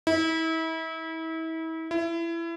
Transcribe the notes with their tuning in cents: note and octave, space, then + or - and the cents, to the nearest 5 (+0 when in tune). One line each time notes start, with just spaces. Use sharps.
E4 -35
E4 +25